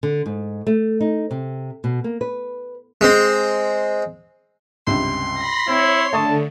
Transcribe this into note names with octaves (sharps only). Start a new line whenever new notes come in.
D3
G#2
A3
D#4
C3
B2
A#3
B4
G#3 C4
C#2 G2 C3 C6
B5 A#6
C4 E4 C#5
D3 A3 A5 C#6 D#6